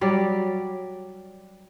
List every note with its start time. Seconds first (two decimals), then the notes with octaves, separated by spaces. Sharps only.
0.01 F#3 G3 D5